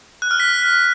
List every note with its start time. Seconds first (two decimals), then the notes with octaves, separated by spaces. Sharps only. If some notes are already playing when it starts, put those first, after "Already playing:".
0.22 F#6
0.31 F6
0.40 B6